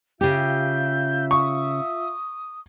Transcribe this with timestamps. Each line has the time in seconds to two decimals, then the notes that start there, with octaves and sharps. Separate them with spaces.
0.21 C#3 F4 G4 E5 G6
1.31 C#6 D#6